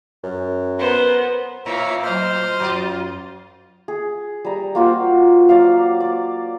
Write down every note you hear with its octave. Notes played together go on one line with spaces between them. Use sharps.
F#2
B3 A#4 C5
A2 E4 C#5 E5 F5 A#5
F#3 C5 D#5 F6
F#2 F#3 F4
G#4
G3 A#5
A#3 F4 F#4 C5
F#3 D5 F5
D5